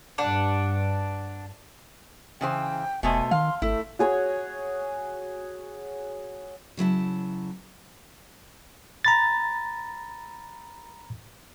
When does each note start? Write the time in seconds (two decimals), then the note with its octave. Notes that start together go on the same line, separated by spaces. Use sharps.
0.18 G2 D4 F#5
2.41 C#3 E3 C5 G5
3.03 E1 B2 A3 C5 G#5
3.31 D#3 F5 C6
3.62 G#1 A3 E4
3.99 F#4 G#4 C#5 F#5
6.77 C#3 F#3 E4 A5
9.05 A#5 B5 A6